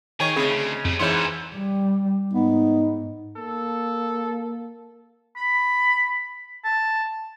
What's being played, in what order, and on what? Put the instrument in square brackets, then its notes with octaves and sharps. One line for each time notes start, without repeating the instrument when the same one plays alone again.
[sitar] D#3 C#5 [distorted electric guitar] G#4 [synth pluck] G#5
[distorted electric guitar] D2 [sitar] C#3 [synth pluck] C4 G#4
[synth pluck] F2 [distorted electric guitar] C3 A3
[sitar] G#2 E3 [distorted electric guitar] B3 A4 [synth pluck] C#5 C6
[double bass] G3
[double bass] G#2 [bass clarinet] B3 [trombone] D#4
[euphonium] A#3 [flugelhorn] A4
[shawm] B5
A5